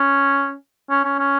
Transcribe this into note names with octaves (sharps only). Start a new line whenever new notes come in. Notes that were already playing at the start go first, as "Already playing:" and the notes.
Already playing: C#4
C#4
C#4
C#4